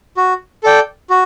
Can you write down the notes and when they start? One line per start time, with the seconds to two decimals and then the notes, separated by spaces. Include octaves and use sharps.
0.17 F#4
0.63 A4 D5 G5
1.10 F#4